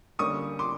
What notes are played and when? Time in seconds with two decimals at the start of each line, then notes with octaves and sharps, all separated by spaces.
0.19 D3 G3 A#3 C#4 C#6 D#6
0.59 C6 D6